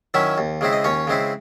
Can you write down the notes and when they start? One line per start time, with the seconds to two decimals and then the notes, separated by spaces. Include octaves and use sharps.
0.14 D#3 F#3 C#4 E4 E5
0.38 D#2
0.61 C#3 G#3 C4 E4
0.73 D#5
0.84 D#2 C#4 C#5
1.07 C#3 G#3 C4 E4